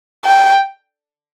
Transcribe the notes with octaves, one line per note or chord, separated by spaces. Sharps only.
G5